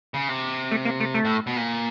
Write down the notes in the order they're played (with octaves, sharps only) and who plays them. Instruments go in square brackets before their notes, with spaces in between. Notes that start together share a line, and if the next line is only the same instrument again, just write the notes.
[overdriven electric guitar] C#3
C3
[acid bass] A3
A#3
A3
A3
[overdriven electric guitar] A2
B2
A#2